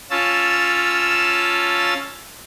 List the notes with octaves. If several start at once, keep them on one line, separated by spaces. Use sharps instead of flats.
C#4 F4 A5 E6